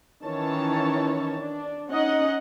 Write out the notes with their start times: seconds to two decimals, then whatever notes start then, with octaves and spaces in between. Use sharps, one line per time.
0.24 D#3 E3 C#4 C#5 A5
1.38 D4
1.89 C#4 D#4 D#5 F#5